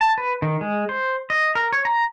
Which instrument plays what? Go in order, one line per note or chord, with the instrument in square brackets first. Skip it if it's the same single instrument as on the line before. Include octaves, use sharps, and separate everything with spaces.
[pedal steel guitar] A5
B4
D#3
G#3
C5
D#5
A#4
C#5
A#5